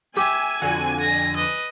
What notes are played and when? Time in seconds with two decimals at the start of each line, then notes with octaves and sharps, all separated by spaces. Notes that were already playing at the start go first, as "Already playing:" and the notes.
0.17 G4 E5 G#5
0.62 F2 D3 F#4
1.00 A#6
1.36 B4 D#5